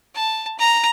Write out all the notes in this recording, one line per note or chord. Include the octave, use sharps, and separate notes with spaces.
A5
A#5